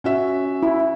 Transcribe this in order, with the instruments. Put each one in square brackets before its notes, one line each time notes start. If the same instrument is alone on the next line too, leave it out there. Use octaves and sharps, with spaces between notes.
[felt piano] C#4 F#4 E5
[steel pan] E4